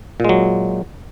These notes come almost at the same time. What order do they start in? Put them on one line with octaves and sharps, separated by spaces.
A#2 G#3 F#3